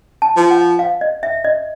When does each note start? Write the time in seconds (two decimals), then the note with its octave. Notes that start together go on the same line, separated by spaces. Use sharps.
0.22 A5
0.37 F3
0.51 F#5
0.79 F5
1.01 D#5
1.23 E5
1.44 D#5